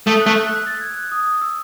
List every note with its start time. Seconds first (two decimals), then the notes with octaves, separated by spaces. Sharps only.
0.06 A3 D#6
0.21 F#6
0.26 A3 E6
0.46 F#6
0.67 A6
0.81 G#6
0.97 F#6
1.12 D#6
1.27 D#6
1.41 E6